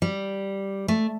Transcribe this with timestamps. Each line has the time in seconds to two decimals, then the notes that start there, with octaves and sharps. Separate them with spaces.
0.02 G3
0.88 A3